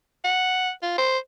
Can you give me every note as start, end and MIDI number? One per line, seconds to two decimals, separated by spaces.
0.24 0.71 78
0.83 0.97 65
0.98 1.18 72